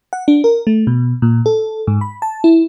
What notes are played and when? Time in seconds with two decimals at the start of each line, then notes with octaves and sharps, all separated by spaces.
0.13 F#5
0.28 D4
0.44 A#4
0.67 A3
0.87 B2
1.22 A#2
1.46 A4
1.87 G#2
2.01 B5
2.22 A5
2.44 E4